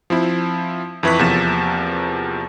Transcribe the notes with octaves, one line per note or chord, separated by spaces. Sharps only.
F3 C4 E4
F2 E3 E4 B4 C#6 B6
E2 C3 F3 A#3 A6 E7